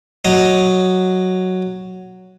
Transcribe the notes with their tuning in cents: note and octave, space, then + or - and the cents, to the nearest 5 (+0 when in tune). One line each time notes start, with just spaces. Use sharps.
F#3 +0 D#5 +0